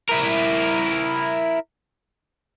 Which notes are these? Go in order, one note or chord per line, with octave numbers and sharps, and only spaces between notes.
E4 A#4